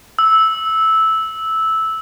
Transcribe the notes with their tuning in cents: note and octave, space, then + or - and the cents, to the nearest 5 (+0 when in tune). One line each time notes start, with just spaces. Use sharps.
E6 -10